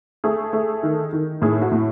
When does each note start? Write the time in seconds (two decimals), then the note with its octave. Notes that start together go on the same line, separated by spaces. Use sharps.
0.24 A3 G#4
0.53 A3
0.83 D#3
1.13 D#3
1.42 A2 G#4
1.62 F#4
1.72 A2